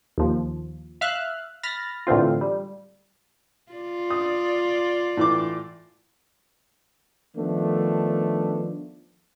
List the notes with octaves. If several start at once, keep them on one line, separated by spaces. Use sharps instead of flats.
D#2 F3
E5 F5 F6 F#6
B5 F6 A6 A#6
A2 D3 E3 C4 F4
G3
F4 D5
D#6
A2 E3 D6
D#3 F3 A3 B3 D4